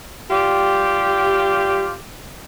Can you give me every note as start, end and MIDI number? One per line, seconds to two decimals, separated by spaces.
0.30 1.94 55
0.30 1.94 65
0.30 1.94 67